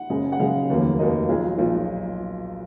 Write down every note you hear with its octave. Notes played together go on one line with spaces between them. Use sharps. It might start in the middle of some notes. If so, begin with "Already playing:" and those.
Already playing: F#5
F#1 F#2 C#3 G#3
F#5
F#1 F#2 C#3 G#3 F5
F1 D#2 D#3 F#3 A#3
F1 D#2 D#3 F#3 A#3 D#5
B1 A#2 F3 G#4
B1 A#2 F3